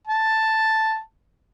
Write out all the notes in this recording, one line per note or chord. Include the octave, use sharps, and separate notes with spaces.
A5